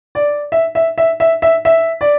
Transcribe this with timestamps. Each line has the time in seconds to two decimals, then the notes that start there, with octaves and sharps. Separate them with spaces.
0.15 D5
0.52 E5
0.75 E5
0.98 E5
1.20 E5
1.42 E5
1.65 E5
2.01 D5